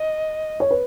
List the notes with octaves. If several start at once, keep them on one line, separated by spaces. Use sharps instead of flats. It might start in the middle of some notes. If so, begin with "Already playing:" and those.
Already playing: D#5
C#5
B4